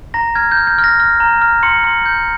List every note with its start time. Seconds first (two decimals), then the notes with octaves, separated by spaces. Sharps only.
0.14 A#5 A#6
0.35 F6 G#6
0.51 G6
0.57 F6
0.67 G6
0.78 F6
0.84 A#6
1.00 F6
1.20 A#5
1.41 F6
1.63 C6 C#7
1.84 C6
2.06 G6